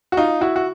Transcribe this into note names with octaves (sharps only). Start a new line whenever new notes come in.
F#4
D#4 F4
E4 F#4
F#4